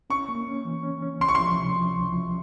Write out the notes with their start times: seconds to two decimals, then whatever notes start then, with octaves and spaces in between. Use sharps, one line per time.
0.10 C#4 C#6
0.28 A#3
0.47 C#4
0.65 E3
0.83 C#4
1.02 C#4
1.20 C#2 C6
1.28 C#6
1.35 F3 C6
1.58 C3
1.76 F3
1.95 C#2
2.13 F3